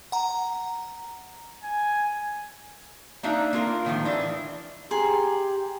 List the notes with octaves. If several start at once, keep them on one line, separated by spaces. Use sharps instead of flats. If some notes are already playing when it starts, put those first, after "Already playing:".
F#5 A#5
G#5
A#3 D4 D#4 E5
A#3 F4 A#4
A2 D#3 F3 G#3
E3 D4 E5
G4 G#4 A#5 C6